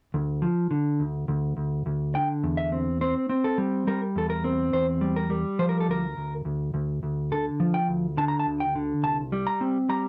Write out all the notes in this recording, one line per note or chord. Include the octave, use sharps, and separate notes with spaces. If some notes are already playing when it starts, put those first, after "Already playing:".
D2
F3
D3
D2
D2
D2
D2
D3 G5
E2
E5
C4
C4 C5
C4
A4
G3
G3 A#4
E2 A4
A#4
C4
E2 C5
G3
A#4
G3
F3 C5
A#4
A4
D2 A#4
D2
D2
D2
D2
D3 A4
F3
G5
D2
D3 A5
A#5
A5
D2
G5
D3
C2 A5
G3
A#5
C4
G3 A#5